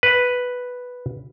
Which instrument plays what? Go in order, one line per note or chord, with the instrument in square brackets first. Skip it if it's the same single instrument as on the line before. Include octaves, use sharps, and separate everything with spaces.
[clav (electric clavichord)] B4